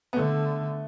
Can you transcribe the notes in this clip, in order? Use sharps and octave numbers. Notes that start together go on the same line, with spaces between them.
B3
D3 A3